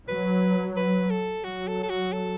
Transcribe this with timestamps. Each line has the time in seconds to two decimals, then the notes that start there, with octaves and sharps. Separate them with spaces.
0.08 F#3 B4
0.77 B4
1.10 A4
1.44 F#3 F#4
1.67 A4
1.83 A4
1.90 F#4
2.13 A4